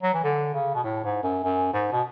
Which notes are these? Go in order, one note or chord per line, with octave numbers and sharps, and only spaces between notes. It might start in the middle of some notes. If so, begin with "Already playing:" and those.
F#3
E3
D3
C#3
B2
A2
G#2
F#2
F#2
G#2
B2